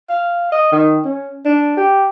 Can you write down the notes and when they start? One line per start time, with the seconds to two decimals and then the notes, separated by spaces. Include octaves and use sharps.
0.10 F5
0.52 D#5
0.72 D#3
1.05 C#4
1.45 D4
1.77 G4